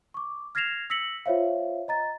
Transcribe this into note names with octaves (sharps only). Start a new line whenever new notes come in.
C#6 D6
F6 G#6 A#6 C7 E7 F7
E6 A#6 B6 C#7 F#7
F4 C5 C#5 E5 F5
D#5 A#5 A6